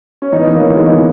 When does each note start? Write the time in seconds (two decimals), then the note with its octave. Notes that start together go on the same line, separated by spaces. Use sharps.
0.22 C#4
0.32 E3 B3 D#4
0.47 E3
0.54 A#3 C#4
0.61 E3
0.76 G#3 B3 D#4
0.92 E3